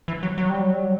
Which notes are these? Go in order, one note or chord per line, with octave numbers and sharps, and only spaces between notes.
E3
F#3
F#3
G3
F#3
G3
F#3